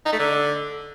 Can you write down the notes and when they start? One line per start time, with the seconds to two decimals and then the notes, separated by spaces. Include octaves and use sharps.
0.06 D#4
0.13 A3
0.19 D3